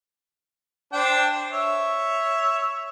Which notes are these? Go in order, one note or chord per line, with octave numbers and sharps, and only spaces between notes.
D4 C5 G5
C#5 E5